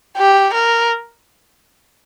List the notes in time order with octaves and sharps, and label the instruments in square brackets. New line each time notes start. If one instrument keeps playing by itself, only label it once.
[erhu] G4
A#4